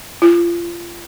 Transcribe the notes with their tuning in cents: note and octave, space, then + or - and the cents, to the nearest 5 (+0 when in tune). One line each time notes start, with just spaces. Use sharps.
F4 -30